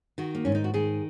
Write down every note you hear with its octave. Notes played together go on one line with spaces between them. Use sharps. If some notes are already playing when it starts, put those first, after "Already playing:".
D#3 F#4
A#3
G#2 C#4
D#4
F#4
D#3 G#4